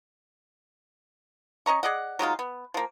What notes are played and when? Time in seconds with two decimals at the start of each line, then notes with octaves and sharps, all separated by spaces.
1.66 C#4 D#5 A#5 C#6
1.83 G#4 D5 D#5 F#5
2.19 F#3 G#3 D#4 F4
2.39 B3
2.74 F3 A#3